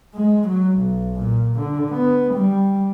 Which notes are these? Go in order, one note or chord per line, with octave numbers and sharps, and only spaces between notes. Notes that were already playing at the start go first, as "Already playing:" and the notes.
G#3
F#3
B1
A#2
D3
B3
G3